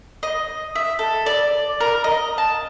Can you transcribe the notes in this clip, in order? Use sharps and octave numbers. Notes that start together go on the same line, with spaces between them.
D#5
E5
A4
D5
A#4
D#5
A5